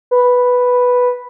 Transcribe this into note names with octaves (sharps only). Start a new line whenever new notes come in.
B4